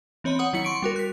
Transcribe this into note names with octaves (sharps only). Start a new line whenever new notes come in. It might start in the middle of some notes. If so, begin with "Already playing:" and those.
E3 C4 C#5 D#5 B5
C#5 F#5 D#6
D#3 F#3 E4 F#5 C#7
C6 C#6 D7
G3 F#4 A#4
F#6 B6